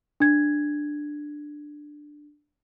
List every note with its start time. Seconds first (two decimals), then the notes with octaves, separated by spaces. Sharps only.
0.20 D4 G#6